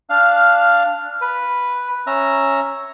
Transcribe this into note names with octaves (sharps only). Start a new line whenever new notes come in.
D4 F5 F6
B4
C#4 E5 A#5